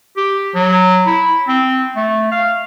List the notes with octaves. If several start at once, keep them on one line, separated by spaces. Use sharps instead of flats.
G4
F#3
E4
C4
A3
F5